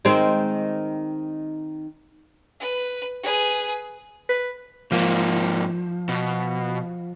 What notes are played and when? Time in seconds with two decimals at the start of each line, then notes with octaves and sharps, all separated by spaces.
0.05 D#3 G#3 C4
2.60 B4
3.23 G#4 B4
4.29 B4
4.92 G#2 F3 A#3
6.09 B2